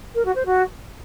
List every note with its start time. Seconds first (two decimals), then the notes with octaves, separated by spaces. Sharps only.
0.15 A#4
0.25 F#4
0.35 C5
0.46 F#4